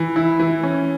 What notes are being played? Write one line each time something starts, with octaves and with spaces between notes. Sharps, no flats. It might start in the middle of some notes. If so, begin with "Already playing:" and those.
Already playing: E3
E4
E3
C#4